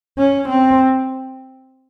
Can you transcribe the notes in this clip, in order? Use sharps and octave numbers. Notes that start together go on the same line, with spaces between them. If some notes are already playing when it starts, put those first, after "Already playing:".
C#4
C4